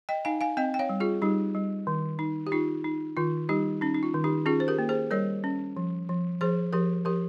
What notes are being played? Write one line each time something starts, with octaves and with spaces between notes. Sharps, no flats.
D#5 G5
D#4 F5 G#5
F5 G#5
C4 D#5 G5
G5
C#5 F5
G3
F4 G#4
G3 D#4 G4
G3
D#3
D#4
G4
D#4 F4
D#4
D#3 F4
G3 D#4 G4
C#4 D#4
D#4
F4
D#3
D#4 G4
C#4 F4 G#4
C5
G4 A#4
A#3
G#4 C5
G3 A#4 C#5
C#4
F3
F3
F3 G#4 C5
F3 G4 A#4
F3 G4 A#4